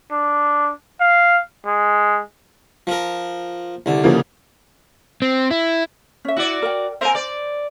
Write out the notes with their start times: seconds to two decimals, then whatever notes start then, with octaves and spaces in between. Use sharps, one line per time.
0.12 D4
1.00 F5
1.66 G#3
2.87 F3 A#4
3.86 C2 D3
4.04 C#3 F3 A#3
5.22 C4
5.51 E4
6.25 C#4 E5
6.37 E4 F#4 D5
6.62 A#4 G5
7.01 C4 A#4 C5 E5 G#5
7.15 C5 D5